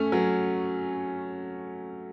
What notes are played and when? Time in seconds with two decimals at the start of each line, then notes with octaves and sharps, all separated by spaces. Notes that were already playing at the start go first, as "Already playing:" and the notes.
Already playing: A3 C#4
0.12 F#3